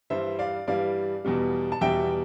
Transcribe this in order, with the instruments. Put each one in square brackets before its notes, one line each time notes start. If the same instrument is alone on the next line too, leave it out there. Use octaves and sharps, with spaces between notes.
[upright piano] G2 E3 G3 C5 E5
D5 F5
G2 E3 G3 D5 F5
E2 B2 G3
A5
E2 B2 G3 E5 G5